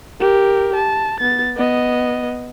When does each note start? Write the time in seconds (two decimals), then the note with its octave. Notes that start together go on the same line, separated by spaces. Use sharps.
0.21 G4 A#4
0.75 A5
1.20 B3 A6
1.57 B3 D#5